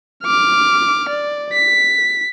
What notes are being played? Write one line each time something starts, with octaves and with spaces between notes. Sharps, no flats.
D6 F6
D5
B6